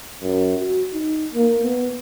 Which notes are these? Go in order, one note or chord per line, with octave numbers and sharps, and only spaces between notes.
F#2
F#4
D#4
A#3
B3